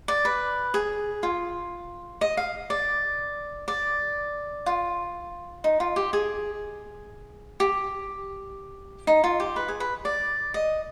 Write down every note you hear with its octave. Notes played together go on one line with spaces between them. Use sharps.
D5
B4
G#4
F4
D#5
F5
D5
D5
F4
D#4
F4
G4
G#4
G4
D#4
F4
G4
B4
G#4
B4
D5
D#5